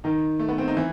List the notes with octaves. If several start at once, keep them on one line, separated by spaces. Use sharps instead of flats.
D#3 D#4
A3
B3
C4
D#4
E3 E4